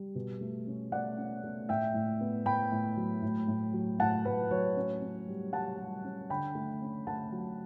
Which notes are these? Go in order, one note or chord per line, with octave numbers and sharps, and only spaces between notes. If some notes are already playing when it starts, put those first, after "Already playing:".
Already playing: G3
B2
A3
C#4
A3 D5 F#5
C#4
A3
A2 E5 G5
A2
B3
A2 G5 B5
A2
F#3
A2
A2
F#3
A2 F#5 A5
A2 B4
F#3 C#5
C#4
C#4
G3
G3 F#5 A5
G3
C#4
D3 G5 B5
A3
C#4
A3 F#5 A5
F#3